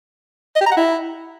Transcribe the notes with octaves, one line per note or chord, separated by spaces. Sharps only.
D#5
G4
A#5
F#5
E4